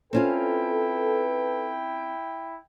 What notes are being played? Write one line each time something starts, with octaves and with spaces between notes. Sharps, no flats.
C4 C#4 E4 F4 A4 B4 G5